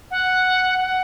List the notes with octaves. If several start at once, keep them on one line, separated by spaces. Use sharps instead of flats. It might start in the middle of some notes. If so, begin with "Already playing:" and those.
F#5
F#5